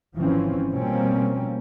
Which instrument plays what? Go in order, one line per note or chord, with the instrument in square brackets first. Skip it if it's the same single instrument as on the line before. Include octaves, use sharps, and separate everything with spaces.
[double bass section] G#1 E3 F3 C4 C#4
B2 F3 G3 A#3 C4 C#4